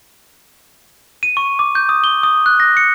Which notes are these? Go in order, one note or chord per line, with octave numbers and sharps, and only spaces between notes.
D#7
C#6
D6
G6
D#6
G7
D#6
F#6
A#6
C#7